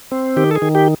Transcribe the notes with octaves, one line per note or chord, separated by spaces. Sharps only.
C4
D#3 G4
A4
G#4
D#3
G4